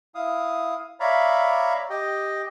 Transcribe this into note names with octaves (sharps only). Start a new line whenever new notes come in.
E4 F5 D#6
C#5 D5 E5 F5 A#5 B5
G4 D#5 G5